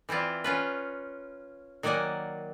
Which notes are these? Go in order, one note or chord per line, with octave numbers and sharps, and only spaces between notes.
E3 C4 E4 F4 D5
C#4 F4 B4
D#3 F#3 A#3 D5 F#5 G#5